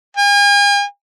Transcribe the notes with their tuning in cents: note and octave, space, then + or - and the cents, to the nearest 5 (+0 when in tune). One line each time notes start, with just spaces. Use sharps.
G#5 -45